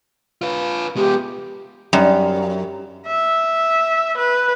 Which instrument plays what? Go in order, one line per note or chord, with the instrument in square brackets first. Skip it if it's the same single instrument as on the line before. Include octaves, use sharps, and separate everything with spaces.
[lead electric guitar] F4 B4
[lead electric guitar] G#3 B3 [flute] G4
[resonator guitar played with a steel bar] F#2 [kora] G3 D#4
[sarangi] E5
B4